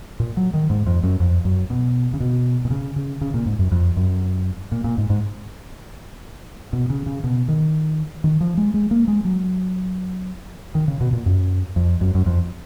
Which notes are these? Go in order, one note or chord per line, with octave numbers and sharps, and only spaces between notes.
A#2
F#3
D#3
G#2
F2
F#2
F2
F#2
B2
C#3
B2
B2
C#3
C#3
C#3
A#2
G#2
F#2
F2
F#2
A#2
A#2
G#2
G#2
B2
C#3
C#3
B2
D#3
D#3
F3
G#3
G#3
A#3
G#3
F#3
D#3
C#3
B2
A#2
F#2
F2
F#2
F#2
F2